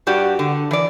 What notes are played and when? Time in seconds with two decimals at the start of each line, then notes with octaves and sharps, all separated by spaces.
0.07 G2 F#4 G4 D5
0.39 D3
0.71 E3 D5